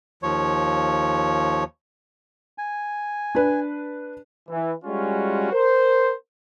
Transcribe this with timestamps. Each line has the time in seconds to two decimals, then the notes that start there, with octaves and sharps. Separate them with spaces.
0.23 D#2 F3 C#5
2.58 G#5
3.35 D4 B4
4.49 E3
4.85 G3 G#3 C#4 F4 F#4
5.52 A#4 C5